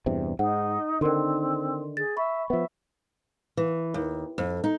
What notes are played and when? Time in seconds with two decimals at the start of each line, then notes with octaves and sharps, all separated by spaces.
0.06 E2 G2 C3
0.39 G#2 D#4 F#5
1.01 D3 D#3 C4 D#4 A#4 C6
1.97 G#4 A6
2.17 E5 B5 C#6
2.50 F3 B3 E5
3.57 E3
3.94 D#2
4.38 F2
4.64 D#4